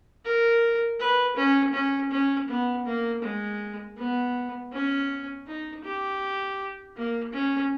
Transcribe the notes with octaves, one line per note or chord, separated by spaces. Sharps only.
A#4
B4
C#4
C#4
C#4
B3
A#3
G#3
B3
C#4
D#4
G4
A#3
C#4